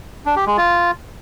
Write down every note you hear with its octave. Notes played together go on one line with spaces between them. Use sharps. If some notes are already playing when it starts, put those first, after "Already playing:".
D4
G4
G#3
F4